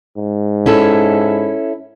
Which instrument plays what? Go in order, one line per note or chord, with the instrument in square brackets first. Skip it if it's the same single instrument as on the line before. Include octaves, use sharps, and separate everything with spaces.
[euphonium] G#2
[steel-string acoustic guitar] C#4 E4 A4